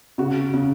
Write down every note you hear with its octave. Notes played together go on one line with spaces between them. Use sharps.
C#3 F#4
C#3